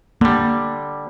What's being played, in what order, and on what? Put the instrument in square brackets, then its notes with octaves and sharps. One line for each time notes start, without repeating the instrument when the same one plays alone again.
[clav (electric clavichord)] D3 G3 [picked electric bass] A#3